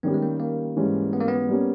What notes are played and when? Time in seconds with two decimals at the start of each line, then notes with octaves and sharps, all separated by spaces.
0.03 D#3 G3 B3 C#4 G4
0.14 G#3
0.22 A#3
0.40 A#3
0.76 G#2 E3 G3 C#4
1.13 B3
1.21 A#3
1.28 B3
1.49 G3 A#3 C#4